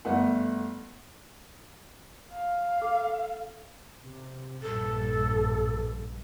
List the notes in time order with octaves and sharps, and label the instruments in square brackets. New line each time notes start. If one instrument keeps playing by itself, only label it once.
[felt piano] G1 A3 F#5
[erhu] F5
[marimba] A4 D6
[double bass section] C3
[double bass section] A#1 G2 [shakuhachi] A4